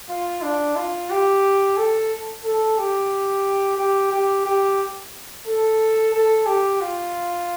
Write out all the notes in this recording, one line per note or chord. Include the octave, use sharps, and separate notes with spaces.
F4
D4
F4
G4
A4
A4
G4
G4
G4
G4
A4
A4
G4
F4